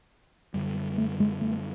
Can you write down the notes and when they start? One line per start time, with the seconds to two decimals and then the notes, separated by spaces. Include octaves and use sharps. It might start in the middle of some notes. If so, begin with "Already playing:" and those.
0.54 F#2 D3 G3
0.98 A3
1.20 G#3
1.41 A3